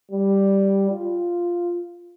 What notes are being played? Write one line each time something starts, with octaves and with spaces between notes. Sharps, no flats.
G3
F4